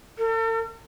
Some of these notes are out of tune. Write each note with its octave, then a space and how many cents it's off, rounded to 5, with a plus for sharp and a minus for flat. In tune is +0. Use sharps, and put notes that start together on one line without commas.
A4 +45